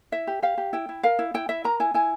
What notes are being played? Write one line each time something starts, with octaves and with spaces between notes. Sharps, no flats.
E4 E5
G4
G4 F5
G4
E4 G5
E4
A#4 F5
E4
E4 G5
E4 E5
A#4 A#5
E4 G#5
E4 G#5